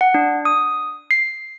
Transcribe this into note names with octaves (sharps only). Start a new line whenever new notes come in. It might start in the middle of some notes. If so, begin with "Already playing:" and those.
F#5
D4
D#6
C7